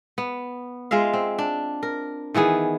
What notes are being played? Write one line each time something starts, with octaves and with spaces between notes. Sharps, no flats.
B3
G#3 F4 E5 F5
C4
D4
A#4
D#3 E3 B3 G#4